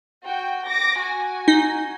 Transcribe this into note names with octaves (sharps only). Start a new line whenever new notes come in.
F#4 G5
D6 A#6
F#4 G#5
D#4